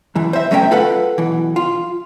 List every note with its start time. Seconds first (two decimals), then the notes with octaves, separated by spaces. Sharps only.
0.15 F#2 E3
0.33 C5 E5
0.51 F#3 A3 C#4 C5 E5 G5
0.71 F4 A4 B4 F5 F#5
1.18 B1 E3
1.56 F4